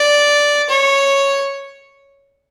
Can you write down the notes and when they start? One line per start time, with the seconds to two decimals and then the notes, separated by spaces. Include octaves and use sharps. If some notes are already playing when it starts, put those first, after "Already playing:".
Already playing: D5
0.69 C#5